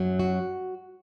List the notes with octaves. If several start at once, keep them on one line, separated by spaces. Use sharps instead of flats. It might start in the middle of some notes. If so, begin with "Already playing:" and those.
Already playing: F#2 F#3
F#4